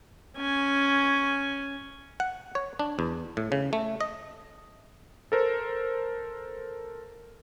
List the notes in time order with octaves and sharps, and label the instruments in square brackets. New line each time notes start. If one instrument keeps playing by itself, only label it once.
[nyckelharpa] C#4 G#5
[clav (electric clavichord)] F#5
C#5
D4
E2
A2
C#3
A3
D#5
[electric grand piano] A4 A#4 C5